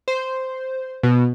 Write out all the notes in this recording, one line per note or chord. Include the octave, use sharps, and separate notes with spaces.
C5
B2